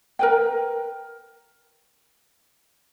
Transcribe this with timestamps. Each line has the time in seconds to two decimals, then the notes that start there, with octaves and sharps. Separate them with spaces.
0.19 A#4 B4 G5